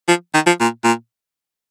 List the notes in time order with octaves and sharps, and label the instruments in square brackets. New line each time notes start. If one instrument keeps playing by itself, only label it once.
[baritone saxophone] F3
D#3
F3
A#2
A#2